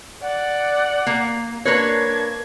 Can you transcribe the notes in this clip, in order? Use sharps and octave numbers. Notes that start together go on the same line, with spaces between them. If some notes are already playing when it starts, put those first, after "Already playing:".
D5 F#5
A#3
A#3 D4 A#4 B4 C#5 G#6